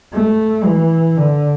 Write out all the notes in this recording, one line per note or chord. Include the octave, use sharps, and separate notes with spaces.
A3
E3
D3